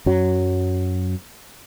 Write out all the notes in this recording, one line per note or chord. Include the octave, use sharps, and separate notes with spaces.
F#2 F#3